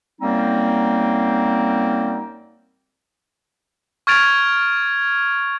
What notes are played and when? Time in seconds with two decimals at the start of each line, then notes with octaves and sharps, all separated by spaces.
0.21 F#2 G3 A#3 C4 D#4
4.07 C#6 F6 G#6 A6 D7 F7